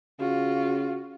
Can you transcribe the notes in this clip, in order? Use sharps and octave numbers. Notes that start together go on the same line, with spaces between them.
C#3 F4 F#4